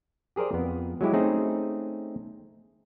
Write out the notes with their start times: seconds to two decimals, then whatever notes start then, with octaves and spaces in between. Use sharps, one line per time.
0.36 G4 G#4 A#4 C5 D5
0.53 F2 B3
1.01 F#3 G#3 E4 G4
1.13 A3 C4 C#4 D#4 G#4 C5